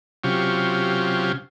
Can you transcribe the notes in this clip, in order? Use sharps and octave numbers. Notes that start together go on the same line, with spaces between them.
C3 F#3 C#4 F4 G4